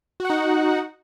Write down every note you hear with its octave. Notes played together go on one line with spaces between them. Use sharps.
D#4 F#4 F#5